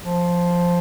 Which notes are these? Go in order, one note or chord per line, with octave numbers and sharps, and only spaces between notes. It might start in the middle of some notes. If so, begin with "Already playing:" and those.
F3